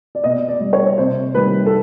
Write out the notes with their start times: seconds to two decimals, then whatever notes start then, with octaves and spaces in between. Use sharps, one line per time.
0.15 D5
0.24 B2 D#5
0.48 D5
0.60 G3
0.73 C#5
0.98 C3 C5
1.35 D#3 G3 B4
1.66 A4